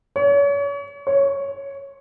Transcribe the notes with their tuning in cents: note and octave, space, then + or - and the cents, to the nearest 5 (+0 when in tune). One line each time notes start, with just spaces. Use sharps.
C#5 +35
C#5 +0